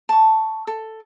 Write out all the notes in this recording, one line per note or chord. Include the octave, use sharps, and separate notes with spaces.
A5 C#6
A4